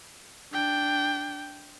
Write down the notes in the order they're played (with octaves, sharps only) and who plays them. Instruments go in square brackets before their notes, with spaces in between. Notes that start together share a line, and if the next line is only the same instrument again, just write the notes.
[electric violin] D4 G5